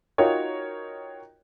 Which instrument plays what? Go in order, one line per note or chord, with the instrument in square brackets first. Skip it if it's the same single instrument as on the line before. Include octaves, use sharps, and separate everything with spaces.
[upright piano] D#4 F4 F#4 A#4 C#5 G5